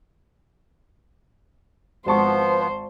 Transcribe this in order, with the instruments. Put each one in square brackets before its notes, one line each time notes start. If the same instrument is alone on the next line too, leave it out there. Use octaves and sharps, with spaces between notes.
[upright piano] G#1 A5 C#6 [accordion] F3 B3 [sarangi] C5